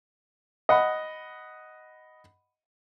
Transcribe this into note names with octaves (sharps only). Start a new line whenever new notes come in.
D#5 F#5 B5